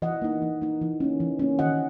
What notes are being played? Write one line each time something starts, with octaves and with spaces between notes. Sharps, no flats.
E3 D#5 F#5
A#3 D#4
E3
A#3 D#4
E3
A#3 C#4
E3
A#3 C#4
D#3 D#5 F#5